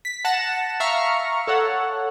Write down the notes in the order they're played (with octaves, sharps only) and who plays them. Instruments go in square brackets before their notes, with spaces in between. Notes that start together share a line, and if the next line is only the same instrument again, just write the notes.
[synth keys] B6
F#5 A5 A#6 E7
E5 F5 A#5 C#6 F6
A4 C#5 F#5